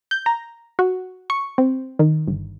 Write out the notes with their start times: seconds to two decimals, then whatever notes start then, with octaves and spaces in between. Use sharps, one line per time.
0.11 G6
0.26 A#5
0.79 F#4
1.30 C#6
1.58 C4
1.99 D#3
2.28 G1